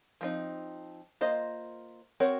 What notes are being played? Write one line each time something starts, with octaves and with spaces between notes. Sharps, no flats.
F3 C4 D#4
A#3 F4 C5 D#5
C4 F#4 A#4 C#5